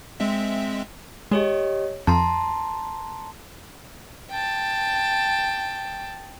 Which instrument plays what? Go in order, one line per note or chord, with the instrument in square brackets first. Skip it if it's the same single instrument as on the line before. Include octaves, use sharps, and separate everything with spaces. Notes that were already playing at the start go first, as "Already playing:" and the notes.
[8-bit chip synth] G#3 C4 E5
[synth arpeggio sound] G#3 [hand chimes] G4 C#5 D#5
[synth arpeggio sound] F2 [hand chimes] A5 A#5 C6
[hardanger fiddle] G5 A5